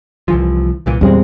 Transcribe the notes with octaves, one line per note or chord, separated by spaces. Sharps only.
C2 E3 F3
C2 A#2 E3
E2 A#2 G3 G#3 C4